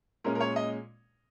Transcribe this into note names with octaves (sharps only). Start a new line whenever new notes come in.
A#2 G#3 C#4 A#4
A#4
C#5
D#5